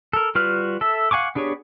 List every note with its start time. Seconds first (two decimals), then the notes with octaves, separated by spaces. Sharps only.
0.13 A4 A#4
0.35 G3 F4 F#4 B4 F6
0.81 A4 E5
1.11 F5 F#5 G#5 C#6 D6
1.35 B3 D4 G4 G#4 C#5